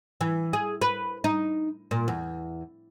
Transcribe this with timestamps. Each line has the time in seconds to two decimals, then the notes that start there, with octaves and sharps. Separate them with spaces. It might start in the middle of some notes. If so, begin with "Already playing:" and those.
0.21 E3
0.53 G#4
0.82 B4
1.24 D#4
1.91 A#2
2.08 E2